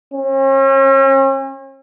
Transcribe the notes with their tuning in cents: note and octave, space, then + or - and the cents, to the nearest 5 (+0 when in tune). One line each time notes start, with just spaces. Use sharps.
C#4 -40